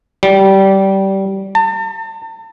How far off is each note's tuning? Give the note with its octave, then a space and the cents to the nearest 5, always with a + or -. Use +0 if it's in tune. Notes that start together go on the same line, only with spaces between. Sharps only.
G3 -20
A5 +40